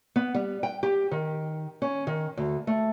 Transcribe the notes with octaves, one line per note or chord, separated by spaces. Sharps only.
B3
G3
G5
G4
D#3
C#4
D#3
D2
A3